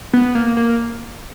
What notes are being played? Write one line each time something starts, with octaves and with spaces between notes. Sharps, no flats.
B3
A#3
A#3